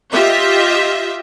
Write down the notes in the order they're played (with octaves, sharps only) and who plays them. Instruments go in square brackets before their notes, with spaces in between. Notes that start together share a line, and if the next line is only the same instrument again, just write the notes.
[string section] F4 G4 D#5 E5